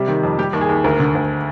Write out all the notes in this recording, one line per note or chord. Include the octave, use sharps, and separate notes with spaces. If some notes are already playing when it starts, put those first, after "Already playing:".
Already playing: C3 G3
D#3
F2
G3 G4
D#2
G#4
D#2
D2 A#4
D3
D2